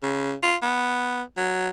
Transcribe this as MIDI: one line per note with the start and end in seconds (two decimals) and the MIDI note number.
0.03 0.34 49
0.43 0.56 65
0.62 1.22 59
1.37 1.69 54